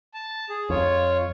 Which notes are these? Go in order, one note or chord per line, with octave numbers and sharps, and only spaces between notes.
A5
G#4
F2 F4 C#5